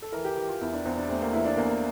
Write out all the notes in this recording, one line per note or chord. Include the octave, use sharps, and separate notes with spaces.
A4
E3 A#4
G4
E3 G4
F4
E2 E4
D4
E2 C4
D4
A3 C4
A#3
E3 E4
D4
E2 A#3